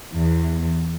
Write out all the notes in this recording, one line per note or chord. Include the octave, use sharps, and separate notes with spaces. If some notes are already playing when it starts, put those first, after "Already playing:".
E2